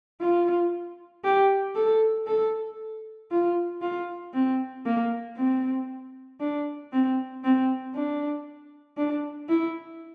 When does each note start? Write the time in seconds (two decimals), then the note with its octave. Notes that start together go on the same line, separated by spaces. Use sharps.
0.21 F4
1.24 G4
1.75 A4
2.27 A4
3.31 F4
3.82 F4
4.34 C4
4.86 A#3
5.37 C4
6.40 D4
6.92 C4
7.44 C4
7.95 D4
8.98 D4
9.49 E4